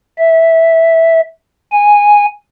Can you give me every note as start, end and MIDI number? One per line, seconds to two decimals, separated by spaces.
0.19 1.21 76
1.72 2.26 80